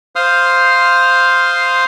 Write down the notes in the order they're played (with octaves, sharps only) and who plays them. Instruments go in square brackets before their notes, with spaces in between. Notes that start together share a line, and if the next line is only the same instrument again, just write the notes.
[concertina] C5 F5 C6 D#6 F6